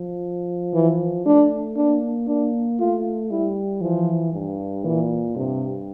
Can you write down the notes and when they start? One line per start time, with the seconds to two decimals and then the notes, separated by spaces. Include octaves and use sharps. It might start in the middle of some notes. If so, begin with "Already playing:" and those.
Already playing: F3
0.74 E3
1.26 A3 D4
1.77 A#3 D4
2.28 A#3 D4
2.79 A3 F4
3.31 G3 E4
3.82 E3 F3
4.33 G2
4.84 A#2 E3
5.36 G2 C3